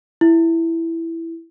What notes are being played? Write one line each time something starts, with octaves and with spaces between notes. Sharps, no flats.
E4